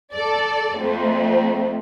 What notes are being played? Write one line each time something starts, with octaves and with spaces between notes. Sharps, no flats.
A4 D5
F2 A3